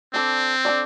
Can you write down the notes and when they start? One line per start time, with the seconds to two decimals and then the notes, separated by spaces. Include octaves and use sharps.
0.14 C4 D4 A4 D5
0.65 D4 A4 D5